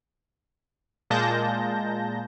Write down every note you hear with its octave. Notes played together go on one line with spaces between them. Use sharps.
A#2 G#3 A#3 A5 G6 A#6